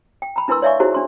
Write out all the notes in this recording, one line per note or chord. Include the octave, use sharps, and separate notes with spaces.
G5
A#5 B5
D4 E4 A#4 B4 C6 E6
C#5 D5 E5 F5 G#5 C#6
D#4 E4 F#4 G#4 C5 A#5
D4 C6 C#6